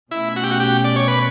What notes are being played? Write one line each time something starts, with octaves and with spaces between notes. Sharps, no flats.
B2 A3 C#4 E4
F#4
G4
F#4
G4
D5
C#5
B4